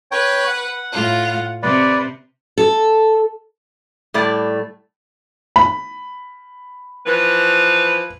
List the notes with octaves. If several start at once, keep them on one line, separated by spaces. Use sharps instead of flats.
B4 C#5 G5
F#5
A2 F4
C3 B4 D5
A4
A2 G3 A3 D5
B5
E3 F3 B4